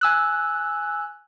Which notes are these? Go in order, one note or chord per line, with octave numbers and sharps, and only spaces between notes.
G#5 E6 F#6